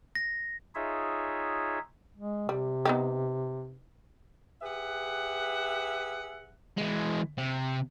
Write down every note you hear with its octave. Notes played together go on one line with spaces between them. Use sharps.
A#6
D#4 F4 G#4 C#5 E5
G#3
C3 G3
B3 D#4 G4
G4 G#4 B4 E5 F#5
E3 G#3
C3